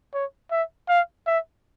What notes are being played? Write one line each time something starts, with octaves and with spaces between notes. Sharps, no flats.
C#5
E5
F5
E5